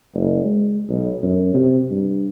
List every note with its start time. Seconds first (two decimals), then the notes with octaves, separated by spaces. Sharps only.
0.14 F#1
0.44 G#3
0.89 B1
1.23 F#2
1.54 C3
1.91 G2